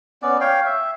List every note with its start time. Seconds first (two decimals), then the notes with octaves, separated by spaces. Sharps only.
0.22 B3 C#4 D5
0.41 C#5 F5 G5
0.65 E5